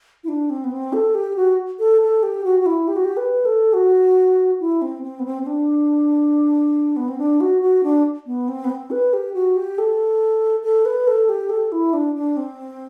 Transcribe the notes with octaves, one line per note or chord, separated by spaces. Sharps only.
E4
D4
C4
B3
C4
A4
G4
F#4
A4
A4
G4
F#4
F#4
E4
G4
F#4
G4
B4
A4
F#4
E4
C4
C4
B3
C4
C4
D4
B3
C4
D4
F#4
F#4
D4
B3
C4
B3
C4
B4
G4
F#4
G4
A4
A4
B4
A4
G4
A4
E4
D4
D4
C4